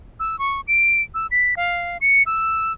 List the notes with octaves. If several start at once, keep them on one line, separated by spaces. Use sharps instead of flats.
E6
C#6
D7
E6
B6
F5
C#7
E6